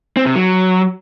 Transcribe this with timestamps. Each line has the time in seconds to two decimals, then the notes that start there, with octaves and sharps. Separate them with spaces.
0.17 C4
0.26 C3
0.36 F#3